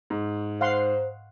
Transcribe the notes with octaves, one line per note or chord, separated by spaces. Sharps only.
G#2
C5 F5 F#5 C6